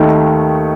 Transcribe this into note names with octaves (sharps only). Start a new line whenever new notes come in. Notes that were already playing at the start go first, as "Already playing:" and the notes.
Already playing: D#2 D#3 A3 D#4